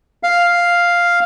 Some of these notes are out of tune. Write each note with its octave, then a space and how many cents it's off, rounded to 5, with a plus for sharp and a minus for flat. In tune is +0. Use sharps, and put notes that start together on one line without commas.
F5 +0